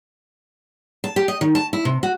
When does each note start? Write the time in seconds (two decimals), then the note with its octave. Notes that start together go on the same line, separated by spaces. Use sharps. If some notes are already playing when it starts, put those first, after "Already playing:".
1.04 A5
1.16 G4
1.28 D#5
1.41 D#3
1.55 A5
1.73 E4
1.85 C3
2.03 F#4